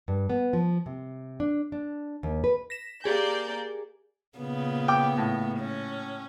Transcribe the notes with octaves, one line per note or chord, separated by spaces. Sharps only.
G2
B3
F3
C3
D4
D4
D#2
B4
A#6 B6 E7
A#3 G4 G#4 D5 G#5 G6
A#2 C#3 B3
G5 D6
A2
C#4